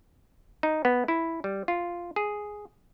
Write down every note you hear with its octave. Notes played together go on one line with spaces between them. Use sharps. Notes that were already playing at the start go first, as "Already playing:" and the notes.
D#4
B3
E4
G3
F4
G#4